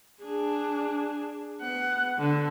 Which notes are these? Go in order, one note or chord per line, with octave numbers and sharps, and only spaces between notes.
D4 G#4
B3 F#5
D3